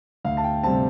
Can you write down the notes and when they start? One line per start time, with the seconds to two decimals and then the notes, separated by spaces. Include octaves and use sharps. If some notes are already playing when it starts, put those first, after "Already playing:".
0.25 D2 F5
0.37 A5
0.44 G5
0.63 C3 G3 C4 A5